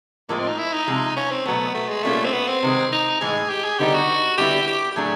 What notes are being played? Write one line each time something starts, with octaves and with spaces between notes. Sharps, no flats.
A2 F3 G#3 A#3
C4
D#4
E4
D#4
C3 F3 G#3
C#4
C4
B2 F#3 A3 B3
A3
G#3
B2 G3 A3 A#3 C#4 F4
C4
B3
C4
C3 D#3 G#3
D#4
A2 E3 G#3 G#4
G4
G#4
D3 G3 B3 D#4 G4
F#4
D3 G3 B3 E4 G4
G4
G4
A2 F#3 A3 D4 G#4